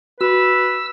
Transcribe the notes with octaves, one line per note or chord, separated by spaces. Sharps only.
F#4 B4 E6